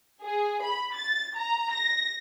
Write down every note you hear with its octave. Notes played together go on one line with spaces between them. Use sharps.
G#4
B5
A6
A#5
A#6